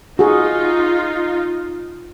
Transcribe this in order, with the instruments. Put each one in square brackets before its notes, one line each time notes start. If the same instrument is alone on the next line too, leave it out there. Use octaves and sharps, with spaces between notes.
[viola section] D#4 F4 [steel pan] F#4 G#4